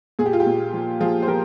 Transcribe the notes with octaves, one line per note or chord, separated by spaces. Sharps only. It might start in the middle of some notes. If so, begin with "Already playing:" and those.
A#2 G#4
G4
F4
G4
A#2
F3
F3 F4 G#4
C5
F3 G4 A#4